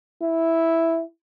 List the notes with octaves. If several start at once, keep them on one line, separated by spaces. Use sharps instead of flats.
E4